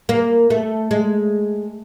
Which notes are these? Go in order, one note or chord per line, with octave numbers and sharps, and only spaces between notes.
A#3
A3
G#3